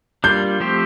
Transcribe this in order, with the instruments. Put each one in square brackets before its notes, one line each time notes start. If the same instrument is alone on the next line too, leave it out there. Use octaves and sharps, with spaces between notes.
[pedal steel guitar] G3 A#3 D4 F4 [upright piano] G6
[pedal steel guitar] F3 A3 C4 G4 C5